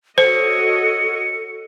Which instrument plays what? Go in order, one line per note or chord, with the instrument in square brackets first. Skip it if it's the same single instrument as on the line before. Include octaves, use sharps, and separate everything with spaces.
[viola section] F#4 C#5 D#5 [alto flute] A4 [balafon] C5 [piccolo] C#7